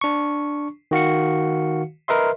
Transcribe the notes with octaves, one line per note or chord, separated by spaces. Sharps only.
D4 C#6
D#3 F#4 F5 C#7
A#4 B4 D#5 E5 C6